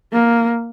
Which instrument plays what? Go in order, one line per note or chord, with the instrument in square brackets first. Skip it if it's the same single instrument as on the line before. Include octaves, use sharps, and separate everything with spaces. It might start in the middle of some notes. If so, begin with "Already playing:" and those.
[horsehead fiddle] A#3